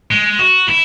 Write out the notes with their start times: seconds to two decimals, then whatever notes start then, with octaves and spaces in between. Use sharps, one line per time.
0.11 G#3
0.39 F#4
0.69 E4